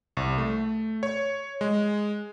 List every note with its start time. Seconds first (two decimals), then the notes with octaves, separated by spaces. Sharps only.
0.17 C2
0.38 A3
1.03 C#5
1.61 G#3